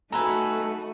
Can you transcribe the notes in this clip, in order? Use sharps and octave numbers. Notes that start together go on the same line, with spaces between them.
A3 D#4 F#4 A4 B4 G#5 A#5